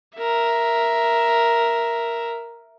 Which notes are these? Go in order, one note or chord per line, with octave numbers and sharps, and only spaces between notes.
A#4 E5